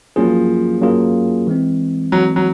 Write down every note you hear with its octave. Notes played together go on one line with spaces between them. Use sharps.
F3 F#3 A#3 C#4 F4 G#4
F#3 A#3 C#4 F4 G#4
E3 G#3 C4
E3 F#3 G#3 C4
F#3